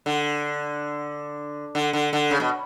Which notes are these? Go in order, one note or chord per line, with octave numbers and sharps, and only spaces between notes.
D3
D3
D3
D3
C#3
B2